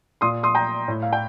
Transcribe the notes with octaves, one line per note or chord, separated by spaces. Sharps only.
A#2 C6 D#6
C6 D#6
G5 A#5
A2
F5
G5